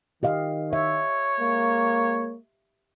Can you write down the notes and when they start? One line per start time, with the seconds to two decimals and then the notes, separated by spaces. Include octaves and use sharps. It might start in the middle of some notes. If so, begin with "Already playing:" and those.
0.23 D#3 G4 D#5 F5
0.73 C#5 E5
1.39 G#3 A#3